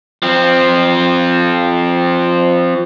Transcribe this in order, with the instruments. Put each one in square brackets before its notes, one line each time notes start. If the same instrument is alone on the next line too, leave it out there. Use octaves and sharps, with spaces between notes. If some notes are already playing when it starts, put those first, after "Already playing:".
[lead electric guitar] F3 C4